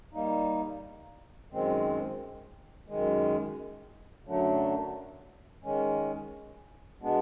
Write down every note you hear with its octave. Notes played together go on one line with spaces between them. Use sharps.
G3 A#3 D#4
F#2 D#3 G#3 C4
F#2 D#3 G#3
F#2 D3 F#3 A3 D4
D#3 G#3 C#4
B2 G#3 B3 D4